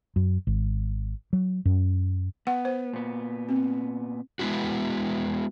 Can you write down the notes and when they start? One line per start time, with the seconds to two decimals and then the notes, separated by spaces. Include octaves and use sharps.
0.16 F#2
0.47 G#1
1.33 F#3
1.65 F#2
2.47 B3 F#5
2.65 C5
2.93 A#2 B3
3.49 C4
4.39 G#3 B3 C#4 E4 F#4